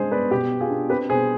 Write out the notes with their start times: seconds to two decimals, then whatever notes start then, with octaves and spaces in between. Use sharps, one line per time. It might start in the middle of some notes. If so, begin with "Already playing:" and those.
Already playing: G#3 D4 G#4 C5
0.12 B3 B4 D5
0.31 B2 G4
0.51 B3
0.61 F4 G#4
0.70 D4
0.89 C4 G4 B4
1.09 B2 G#4 C5